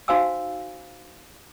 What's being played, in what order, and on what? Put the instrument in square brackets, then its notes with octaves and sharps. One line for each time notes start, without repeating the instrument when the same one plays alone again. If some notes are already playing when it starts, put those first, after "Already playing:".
[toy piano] D#4 F#4 C5 F5 G#5 E6